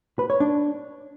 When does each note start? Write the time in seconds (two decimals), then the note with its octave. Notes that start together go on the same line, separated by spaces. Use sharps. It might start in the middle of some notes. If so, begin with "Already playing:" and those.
0.19 B4
0.30 C#5
0.40 D4